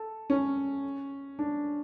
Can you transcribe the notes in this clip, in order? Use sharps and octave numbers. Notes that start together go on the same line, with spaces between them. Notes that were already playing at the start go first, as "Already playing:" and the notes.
Already playing: A4
C#4
D4